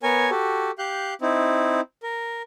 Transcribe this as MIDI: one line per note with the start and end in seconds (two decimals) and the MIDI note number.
0.03 0.30 59
0.03 0.30 70
0.03 0.30 73
0.03 0.30 80
0.31 0.71 66
0.31 0.71 67
0.31 0.71 69
0.79 1.14 67
0.79 1.14 77
0.79 1.14 90
0.79 1.14 91
1.21 1.81 60
1.21 1.81 63
1.21 1.81 64
2.03 2.42 70